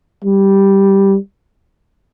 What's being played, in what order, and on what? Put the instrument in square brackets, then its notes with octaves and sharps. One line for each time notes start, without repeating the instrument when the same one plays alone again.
[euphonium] G3